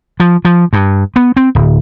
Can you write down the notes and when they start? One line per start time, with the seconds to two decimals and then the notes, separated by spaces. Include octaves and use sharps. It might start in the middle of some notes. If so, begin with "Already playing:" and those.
0.20 F3
0.45 F3
0.73 G2
1.16 B3
1.37 C4
1.55 D1